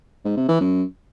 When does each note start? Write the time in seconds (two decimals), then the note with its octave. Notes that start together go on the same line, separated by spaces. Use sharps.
0.25 G#2
0.37 C3
0.49 E3
0.60 F#2